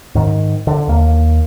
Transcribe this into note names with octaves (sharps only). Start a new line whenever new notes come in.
G#2 D#3
D3
D#2 A#3